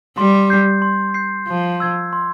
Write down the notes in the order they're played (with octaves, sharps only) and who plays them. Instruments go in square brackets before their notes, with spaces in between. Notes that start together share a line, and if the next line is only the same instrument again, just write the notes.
[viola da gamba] G3 [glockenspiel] C6
[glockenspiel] G6 C7
C6
G6 C7
[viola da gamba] F3 [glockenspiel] C6
[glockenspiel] E6 G#6
C6